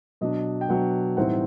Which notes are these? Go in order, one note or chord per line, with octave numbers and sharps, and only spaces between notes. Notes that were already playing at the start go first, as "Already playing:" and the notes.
B2 F#3 B3 D4 D#5
G5
B2 F#3 B3 D4 F#5
A2 E3 G3 C4 D#4 F#5